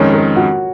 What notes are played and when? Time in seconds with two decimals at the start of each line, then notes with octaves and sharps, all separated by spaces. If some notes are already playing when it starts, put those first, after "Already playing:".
Already playing: F2 D#3 G#3 C#4 C#5
0.13 A#4
0.36 F#4